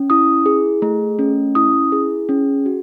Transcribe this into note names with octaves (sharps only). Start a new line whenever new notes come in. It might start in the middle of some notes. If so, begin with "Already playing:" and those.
Already playing: C#4
E4 D#6
G#4
A3
C#4
E4 D#6
G#4
C#4
F#4